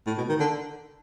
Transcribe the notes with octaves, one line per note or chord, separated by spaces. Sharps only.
A2
B2
D#3
D3